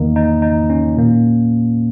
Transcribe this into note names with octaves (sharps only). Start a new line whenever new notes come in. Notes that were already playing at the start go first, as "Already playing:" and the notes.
Already playing: E2 D#3 A#3 D#4
D#4
D#4
C#4
A#2 A#3